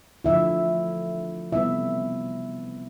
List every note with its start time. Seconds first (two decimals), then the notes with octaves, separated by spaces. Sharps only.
0.24 D3 F3 A3 E4 E5
1.52 C3 G3 B3 E4 E5